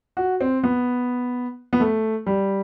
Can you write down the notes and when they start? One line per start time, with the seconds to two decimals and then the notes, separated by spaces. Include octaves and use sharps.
0.17 F#4
0.41 C4
0.63 B3
1.73 B3
1.80 A3
2.27 G3